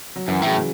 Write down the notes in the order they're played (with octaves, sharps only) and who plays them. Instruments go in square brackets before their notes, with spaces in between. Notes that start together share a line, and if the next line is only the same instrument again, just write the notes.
[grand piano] F#3
[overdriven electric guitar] F#2 [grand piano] E3
[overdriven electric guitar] A2 [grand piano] C#3 F#3